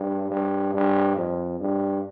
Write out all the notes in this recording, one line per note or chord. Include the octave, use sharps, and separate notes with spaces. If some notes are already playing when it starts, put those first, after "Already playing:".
Already playing: G2
G2
G2
F2
G2